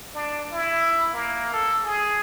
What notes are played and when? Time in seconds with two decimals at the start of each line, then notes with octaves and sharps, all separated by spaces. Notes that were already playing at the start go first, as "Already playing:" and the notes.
0.15 D4
0.52 E4
1.13 A#3
1.54 A4
1.84 G#4